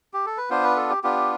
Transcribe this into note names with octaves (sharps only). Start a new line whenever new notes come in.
G4
A4
B4
B3 D4 F4 C5
B4
A4
G4
B3 D4 F4 G4